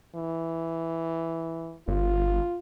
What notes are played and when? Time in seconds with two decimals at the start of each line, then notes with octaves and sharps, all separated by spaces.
0.15 E3
1.88 G1 F4